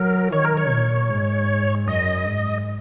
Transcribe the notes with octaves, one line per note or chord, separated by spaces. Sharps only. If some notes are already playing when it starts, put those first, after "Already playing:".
Already playing: F#3 A#4
D#3 C#5
A#4
C#5
A#2
G#2
F#2 D#5
G#2